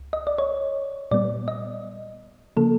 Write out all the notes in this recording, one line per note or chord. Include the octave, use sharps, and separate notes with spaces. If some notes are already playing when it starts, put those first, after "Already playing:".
Already playing: C#2
D#5
D5
C#5
A#2 G3 B3 D5
D#5
C#3 F3 A#3 A4